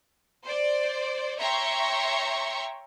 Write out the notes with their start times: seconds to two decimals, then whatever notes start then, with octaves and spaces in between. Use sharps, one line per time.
0.45 C5 D5
1.40 C#5 E5 G5 A#5 C6 C#6